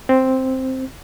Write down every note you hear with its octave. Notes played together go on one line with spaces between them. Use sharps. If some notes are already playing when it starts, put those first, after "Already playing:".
C4